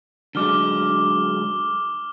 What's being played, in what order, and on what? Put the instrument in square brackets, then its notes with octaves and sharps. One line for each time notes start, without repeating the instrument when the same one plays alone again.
[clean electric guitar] D3 F#3 G#3 [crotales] D6 F6 G7